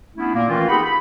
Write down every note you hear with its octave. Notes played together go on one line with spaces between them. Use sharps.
A3 B3 C#4 D4 E4
A#2 A#3
D#3 E3 A3 A#3 C#4 F4
C4 D#4 G4 G#4 F#5 B5
B5